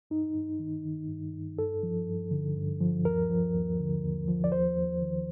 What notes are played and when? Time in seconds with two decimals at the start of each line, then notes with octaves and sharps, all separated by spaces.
0.10 G2 D#4
0.35 G2
0.59 D#3
0.85 D#3
1.09 G2
1.34 G2
1.58 G2 A4
1.83 F3
2.08 G2
2.31 D3
2.56 G2
2.81 F3
3.05 D#2 A#4
3.30 F3
3.55 D#2
3.79 D3
4.04 D#2
4.28 F3
4.44 D5
4.52 D#2 C5
4.76 D#2
5.02 D#3